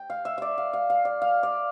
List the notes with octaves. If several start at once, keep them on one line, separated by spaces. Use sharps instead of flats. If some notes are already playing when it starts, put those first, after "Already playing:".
Already playing: G5
F5
E5
D5 E5
F5
F5
F5
D5
F5
D5